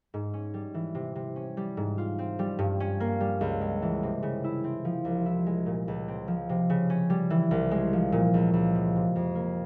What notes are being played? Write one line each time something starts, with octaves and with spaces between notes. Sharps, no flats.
G#2
C#4
G3
E3
C3
C3
C#4
G3
G#2
F4
C4
G3
G2
C#4
A#3
G3
C#2
G#3
E3
C3
C#3
E4
C4
F3
C2
E4
G#3
A#2
C#2
C4
F3
C3
C#3
C#4
G3
E3
C2
G#3
F3
A#2
C#2
C#2
F3
C3
F2
A#3